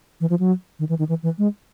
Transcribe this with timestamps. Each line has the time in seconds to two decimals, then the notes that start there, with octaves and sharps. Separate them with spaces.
0.20 E3
0.30 F3
0.39 F#3
0.79 D#3
0.89 E3
0.99 D#3
1.09 E3
1.23 E3
1.38 G#3